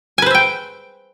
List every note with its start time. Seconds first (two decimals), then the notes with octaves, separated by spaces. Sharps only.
0.18 G#5
0.22 B4
0.26 C5
0.30 E5
0.35 G5